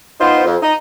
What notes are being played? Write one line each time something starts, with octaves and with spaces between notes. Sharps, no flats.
B3 D#4 F4 C5
F2
D#4 D#5